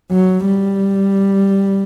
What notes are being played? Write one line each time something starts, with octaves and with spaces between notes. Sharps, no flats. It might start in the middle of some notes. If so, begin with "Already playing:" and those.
F#3
G3